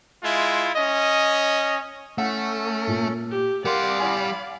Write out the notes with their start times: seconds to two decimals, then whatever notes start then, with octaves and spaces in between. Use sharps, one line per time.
0.23 G#3 E4 F4
0.76 C#4 D#5
2.18 A3 C#4 A4 F#5
2.87 A#2
3.31 G4
3.65 G3 G4 A#4 D5 F5 F#5 C6 D6
4.00 F#5 G#5 B5